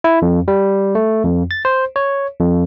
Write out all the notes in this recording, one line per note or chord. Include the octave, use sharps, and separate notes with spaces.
E4
F2
G3
A3
F2
A6
C5
C#5
F2